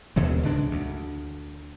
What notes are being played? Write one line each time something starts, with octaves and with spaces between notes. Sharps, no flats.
D#2 B2 D3 G#3
C#2 G#2 G#3 D4
D2